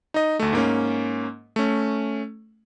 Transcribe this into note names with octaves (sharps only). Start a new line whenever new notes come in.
D#4 D#5
D2 A3
G#2 A#3 C#4
A3 C#4